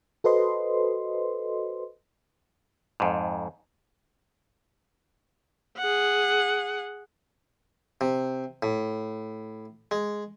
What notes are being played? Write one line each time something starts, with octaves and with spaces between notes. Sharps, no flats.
F#4 A4 B4 C5 D#5 C6
F2 G#2
G#4 F#5
C3
A2
G#3